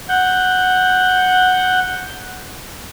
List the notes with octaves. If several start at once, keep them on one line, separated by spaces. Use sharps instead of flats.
F#5 G6